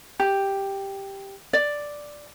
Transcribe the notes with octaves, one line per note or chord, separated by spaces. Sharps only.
G4
D5